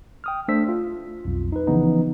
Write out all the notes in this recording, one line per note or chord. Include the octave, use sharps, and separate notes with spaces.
G5 D#6 F6
A3 D4 C5 E6 B6
F4
B1 F2
D#4 B4
C#3 E3 F3 B3 D#4